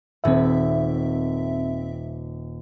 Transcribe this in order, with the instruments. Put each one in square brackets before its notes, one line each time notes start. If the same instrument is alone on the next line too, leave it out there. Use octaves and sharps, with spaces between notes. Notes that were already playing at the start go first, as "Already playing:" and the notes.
[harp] D#1 D#3 B5 [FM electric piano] C4 E5